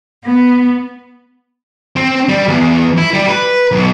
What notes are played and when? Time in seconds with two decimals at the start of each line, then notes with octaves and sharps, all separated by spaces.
0.23 B3
1.96 C4
2.29 G3
2.48 E2
2.97 E4
3.13 G3
3.28 B4
3.71 B1